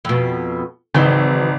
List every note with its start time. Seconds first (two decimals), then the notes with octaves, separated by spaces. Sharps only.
0.05 F2 B2
0.94 G#1 C#3 E3 F#3 C4 D#4